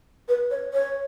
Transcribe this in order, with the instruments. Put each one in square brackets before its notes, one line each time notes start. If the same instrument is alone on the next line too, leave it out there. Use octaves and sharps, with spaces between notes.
[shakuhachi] B4
C#5
C#5